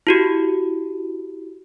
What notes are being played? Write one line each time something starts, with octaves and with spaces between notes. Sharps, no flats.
E4 F#4 G4